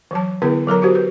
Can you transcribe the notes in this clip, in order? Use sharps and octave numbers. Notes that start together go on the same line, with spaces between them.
E3 F#3 A5
D3 B3 E4 G#4 B4
F#3 A4 A#4 A#5
F#4 G4 C5
B4